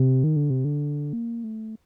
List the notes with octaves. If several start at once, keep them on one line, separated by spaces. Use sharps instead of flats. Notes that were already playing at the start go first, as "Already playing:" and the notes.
Already playing: C3
D#3
D3
C3
D3
A#3
A3